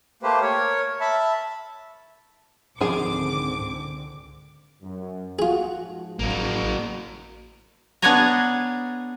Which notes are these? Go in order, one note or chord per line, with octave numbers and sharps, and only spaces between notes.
A3 A#3 G4 B4 C5
A#4 C#5
E5 A5 B5
C#2 G#2 D3 D#3 F3 C4 G#4 D6
F#2
F4 F#4 G#4
G#2 F3
A1 F#3 A#3
B3 D4 G#4 C#5 G#5 A#5